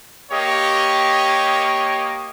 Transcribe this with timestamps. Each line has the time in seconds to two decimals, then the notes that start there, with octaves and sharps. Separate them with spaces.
0.31 A#3 G4 C#5 D#5